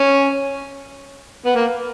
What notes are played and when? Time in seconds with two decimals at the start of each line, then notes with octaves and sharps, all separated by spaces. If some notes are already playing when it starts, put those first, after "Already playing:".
Already playing: C#4
1.46 B3
1.55 A#3